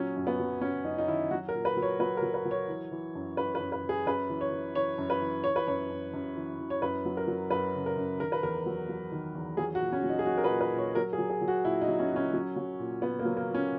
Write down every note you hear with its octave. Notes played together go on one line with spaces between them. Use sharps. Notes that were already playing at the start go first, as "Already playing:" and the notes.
Already playing: A#2 F#3 C#4
F#2
B3
F#3
F#2 C#4
F#2 D#4
D#4
D#3 E4
F#3 F#4
A#4
A#2
B4
F#3
C#5
F#3 B4
A#4
F#3
B4
F#3
C#5
E3
E3
F#2
F#2 B4
B4
F#2
B4
E3
G#4
F#2 B4
E3
C#5
E3
E3 C#5
F#2
B4
E3
E3 C#5
B4
F#2 C#5
F#2
F#2
E3
E3
C#5
F#2 B4
F#3
A#4
F#3
F#2 B4
C#3
A#4
F#2
D#3 A#4
B4
E2 A#4
F#3
F#3
D#3
E2
F#3 G#4
F#4
A#2
C#4
F#3
D#4
G#4
F#3 F#4
A#4
B4
A#2
B4
A#2
C#5
F#3 A#4
G#4
F#3
G#4
F#3
F#4
A#2 E4
D#4
F#3
C#4
A#2 C#4
F#3
F#3
A#2
A#2 B3
A#3
F#3
A#3
A#2
C#4